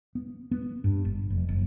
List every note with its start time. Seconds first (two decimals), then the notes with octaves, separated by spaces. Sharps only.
0.15 B3
0.51 B3
0.84 G2
1.05 G1
1.30 F1
1.48 F#1